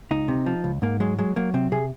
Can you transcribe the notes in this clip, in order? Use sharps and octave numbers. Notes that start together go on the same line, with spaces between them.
C#2 D#4
C3
F3
C#2
G#2 A#3
F#3 G#3
F#3 G#3
F#3 A#3
C3 C4
C3 G#4